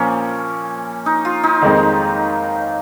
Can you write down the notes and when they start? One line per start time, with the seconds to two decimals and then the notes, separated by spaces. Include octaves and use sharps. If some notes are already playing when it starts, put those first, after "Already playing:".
Already playing: A#2 F3 A#3 C#4
1.06 D#4
1.25 F4
1.43 D#4
1.62 F2 D#3 G#3